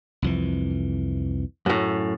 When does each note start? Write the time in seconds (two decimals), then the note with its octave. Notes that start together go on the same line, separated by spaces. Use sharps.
0.22 C2 F2 E3
1.66 F#2 A2